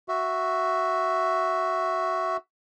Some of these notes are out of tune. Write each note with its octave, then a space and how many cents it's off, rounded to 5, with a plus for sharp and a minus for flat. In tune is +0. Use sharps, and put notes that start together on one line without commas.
F#4 +0 E5 +0